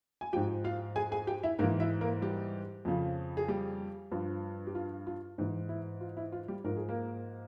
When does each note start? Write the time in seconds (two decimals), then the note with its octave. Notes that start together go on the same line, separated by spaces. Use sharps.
0.21 G#5
0.33 G#2 F3 G4 G5
0.64 F4 F5
0.96 G#4 G#5
1.12 G#4 G#5
1.27 G4 G5
1.43 E4 E5
1.59 G#2 A#3 A#4
1.64 E3
1.80 E4 E5
2.01 A#3 A#4
2.22 G3 G4
2.85 F2 C#3 F3
3.37 G#4
3.48 G3 G4
4.12 G2 F3
4.67 G4
4.75 F4
5.07 F4
5.38 G#2 E3
5.69 E4
6.01 F4
6.17 E4
6.32 F4
6.48 G3 G4
6.64 G#2 F3 A#4
6.77 G#4
6.89 A#3 A#4